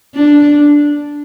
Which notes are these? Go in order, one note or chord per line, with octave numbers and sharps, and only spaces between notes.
D4